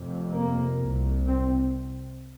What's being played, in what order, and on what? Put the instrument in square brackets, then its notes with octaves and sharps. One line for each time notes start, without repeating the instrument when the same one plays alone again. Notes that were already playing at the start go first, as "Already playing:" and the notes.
Already playing: [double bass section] F1 F2 C3
A#3
C2
C3
C4